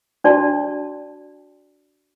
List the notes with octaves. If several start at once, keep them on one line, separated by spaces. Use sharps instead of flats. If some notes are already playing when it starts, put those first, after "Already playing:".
D4 F#4 D5 A5